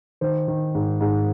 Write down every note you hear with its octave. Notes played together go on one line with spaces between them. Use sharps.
D#3 C5
D#3
G#2
G#2